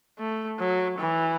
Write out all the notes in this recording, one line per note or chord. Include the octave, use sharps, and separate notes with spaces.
A3
F#3
E3